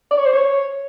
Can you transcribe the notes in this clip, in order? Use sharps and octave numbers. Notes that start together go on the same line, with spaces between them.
D5
C#5
C5
C#5